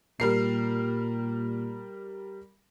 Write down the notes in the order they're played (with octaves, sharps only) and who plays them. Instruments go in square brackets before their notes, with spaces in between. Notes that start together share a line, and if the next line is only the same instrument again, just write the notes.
[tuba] A#2 [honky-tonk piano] G3 A#4 C7